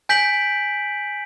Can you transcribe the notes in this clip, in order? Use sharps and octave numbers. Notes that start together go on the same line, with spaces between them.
G#5 G6 B6 D7 F#7